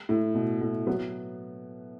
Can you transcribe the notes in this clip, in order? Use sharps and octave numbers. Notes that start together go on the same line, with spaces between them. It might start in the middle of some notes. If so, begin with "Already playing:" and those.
A2
B2
A2
F#3 B3